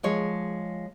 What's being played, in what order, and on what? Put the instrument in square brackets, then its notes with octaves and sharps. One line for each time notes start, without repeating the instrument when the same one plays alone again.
[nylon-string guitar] F3 G#3 C#5